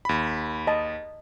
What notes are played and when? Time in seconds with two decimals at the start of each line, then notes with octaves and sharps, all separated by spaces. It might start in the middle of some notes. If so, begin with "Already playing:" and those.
0.05 D#2 B5
0.67 D#5 A5